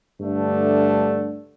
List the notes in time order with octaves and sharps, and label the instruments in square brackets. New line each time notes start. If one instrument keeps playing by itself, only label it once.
[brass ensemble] G2 D3 A3 D4